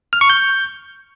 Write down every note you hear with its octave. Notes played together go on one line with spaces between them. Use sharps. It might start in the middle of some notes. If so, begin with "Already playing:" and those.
F6
C#6
G6